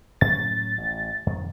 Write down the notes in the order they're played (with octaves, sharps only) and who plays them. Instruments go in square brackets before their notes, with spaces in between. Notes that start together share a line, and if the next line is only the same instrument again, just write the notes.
[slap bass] A2 F#3 C#4 [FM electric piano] A6
[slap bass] A1
F2 D#3